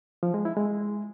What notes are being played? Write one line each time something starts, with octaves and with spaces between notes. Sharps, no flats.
F3
G#3
E4
G#3